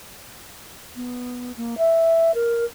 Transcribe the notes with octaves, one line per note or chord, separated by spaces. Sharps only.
B3
A#3
E5
A#4